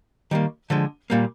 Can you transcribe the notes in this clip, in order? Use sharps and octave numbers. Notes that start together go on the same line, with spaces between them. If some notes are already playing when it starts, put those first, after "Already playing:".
D#3 G3 A#3
D3 F3 G#3
A#2 G3 A#3